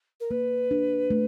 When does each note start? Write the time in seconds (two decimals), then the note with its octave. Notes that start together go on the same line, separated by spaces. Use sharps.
0.20 A#4
0.31 A#3 B4
0.71 D4
1.10 A3